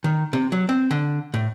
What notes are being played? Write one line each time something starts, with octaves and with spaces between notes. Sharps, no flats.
D#3
C3
F#3
C4
D3
A2